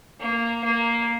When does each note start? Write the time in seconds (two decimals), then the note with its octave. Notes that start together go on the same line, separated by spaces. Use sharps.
0.20 A#3
0.63 A#3